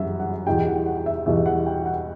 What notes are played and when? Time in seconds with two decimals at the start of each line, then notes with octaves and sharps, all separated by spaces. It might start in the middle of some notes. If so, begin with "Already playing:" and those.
Already playing: G1 F#2 E3 G3 E5 F#5
0.20 F#5
0.47 E2 B2 G3 G5
0.66 F#5
0.86 F#5
1.06 E5
1.26 E2 B2 G3 E5
1.46 F#5
1.66 G5
1.86 F#5